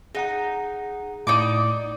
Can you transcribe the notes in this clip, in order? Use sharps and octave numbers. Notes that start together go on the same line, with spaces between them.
D#4 G#4 F#5 A#5
A2 D#4 D5 D6